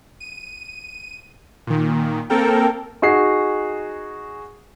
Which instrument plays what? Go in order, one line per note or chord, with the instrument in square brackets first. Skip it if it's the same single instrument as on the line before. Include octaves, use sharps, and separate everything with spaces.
[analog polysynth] D#7
A#2 D#3
A#3 C4 A4 A#4 G5
[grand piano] D#4 F#4 G#4 C7